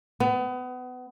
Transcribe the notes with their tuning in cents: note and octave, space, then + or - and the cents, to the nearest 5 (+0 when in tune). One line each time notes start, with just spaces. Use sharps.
B3 +30